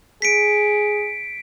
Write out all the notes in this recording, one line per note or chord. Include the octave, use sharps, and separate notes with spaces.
G#4 B6 C#7 D7